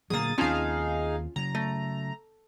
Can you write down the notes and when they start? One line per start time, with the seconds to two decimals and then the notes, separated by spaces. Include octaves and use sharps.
0.10 A#2 D3 F#3 A#3 G#4 D#6 A6
0.38 D#2 C4 C#4 D#4 F4 G#4 F5 A5
1.36 C#3 F#3 A#5
1.55 A3